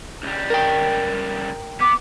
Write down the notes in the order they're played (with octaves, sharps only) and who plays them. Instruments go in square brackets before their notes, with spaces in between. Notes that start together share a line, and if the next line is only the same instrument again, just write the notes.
[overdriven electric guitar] C#2 G3
[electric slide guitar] A#4 G5
[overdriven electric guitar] B3 [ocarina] D6